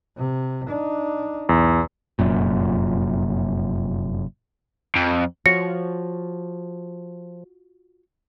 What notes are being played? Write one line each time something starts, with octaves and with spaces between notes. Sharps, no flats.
C3
D4 D#4
B1 E2
F1 F#2 A#2
F2
F3 F4 F#4 C#5 A#6 C#7